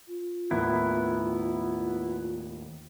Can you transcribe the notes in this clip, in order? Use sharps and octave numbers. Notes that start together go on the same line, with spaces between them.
F4
D#2 A2 D#3 B3 E4